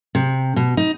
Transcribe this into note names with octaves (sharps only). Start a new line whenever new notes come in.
C3
B2
D#4